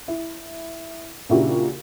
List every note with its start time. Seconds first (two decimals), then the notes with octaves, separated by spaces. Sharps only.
0.08 E4
1.29 A#2 C#3 D4 E4 F#4 G4